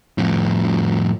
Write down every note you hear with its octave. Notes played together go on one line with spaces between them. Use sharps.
F2 A2